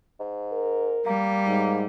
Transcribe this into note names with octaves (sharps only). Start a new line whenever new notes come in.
G#2
A#4
G3 A#3
G#2